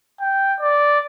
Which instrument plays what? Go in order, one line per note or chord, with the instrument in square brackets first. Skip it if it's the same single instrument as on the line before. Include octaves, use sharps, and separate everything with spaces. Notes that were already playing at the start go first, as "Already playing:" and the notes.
[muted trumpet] G5
D5